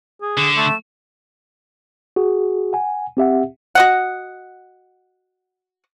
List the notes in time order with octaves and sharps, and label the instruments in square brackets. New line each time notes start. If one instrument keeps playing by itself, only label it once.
[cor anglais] G#4
[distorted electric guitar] D3 [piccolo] E7
[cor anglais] A3
[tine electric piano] F#4 G#4
F#5 G#5
C4 G4 E5 F#5
[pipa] F#4 D#5 F#5